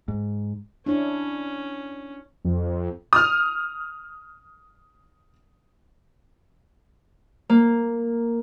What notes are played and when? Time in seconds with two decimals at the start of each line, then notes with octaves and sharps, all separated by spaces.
0.08 G#2
0.86 C#4 D4 E4 C#5
2.45 F2
3.13 D#6 F6
7.49 A#3